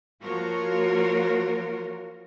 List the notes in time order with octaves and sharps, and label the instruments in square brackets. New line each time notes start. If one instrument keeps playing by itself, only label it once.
[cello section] F3 A#3 F4 F#4 A#4 C#5